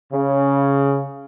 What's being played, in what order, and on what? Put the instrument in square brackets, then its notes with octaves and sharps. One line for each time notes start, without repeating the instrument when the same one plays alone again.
[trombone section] C#3